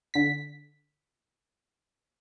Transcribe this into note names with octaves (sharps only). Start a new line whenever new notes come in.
D3 B6